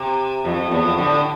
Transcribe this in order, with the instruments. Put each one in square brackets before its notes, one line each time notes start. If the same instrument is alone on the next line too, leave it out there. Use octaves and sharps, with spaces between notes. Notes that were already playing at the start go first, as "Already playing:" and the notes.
Already playing: [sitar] C3
[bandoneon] F2 [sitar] A2
[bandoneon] F2
[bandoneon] E2 [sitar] A2
[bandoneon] F2
[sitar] A2 [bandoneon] D3